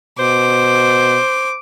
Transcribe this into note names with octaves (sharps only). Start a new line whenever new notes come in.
B2 C5 D6